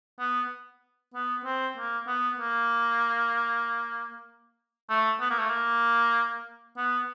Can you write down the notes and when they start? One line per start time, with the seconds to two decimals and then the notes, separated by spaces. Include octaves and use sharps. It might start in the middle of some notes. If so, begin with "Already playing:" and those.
0.19 B3
1.14 B3
1.45 C4
1.77 A#3
2.07 B3
2.39 A#3
4.90 A3
5.20 B3
5.30 A#3
5.39 A3
5.50 A#3
6.77 B3